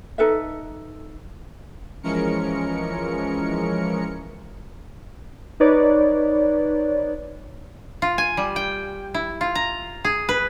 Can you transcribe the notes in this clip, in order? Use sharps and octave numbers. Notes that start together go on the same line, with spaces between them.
D#4 A4 B4 E5
E3 F3 G#3 C#4 A#4 C#7
D#4 B4 C#5 D5
F4
G#5
G3
G5
E4
F4
A#5
G#4
B4